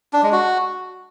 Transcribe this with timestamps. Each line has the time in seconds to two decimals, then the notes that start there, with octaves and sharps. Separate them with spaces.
0.13 D4
0.23 G#3
0.32 F#4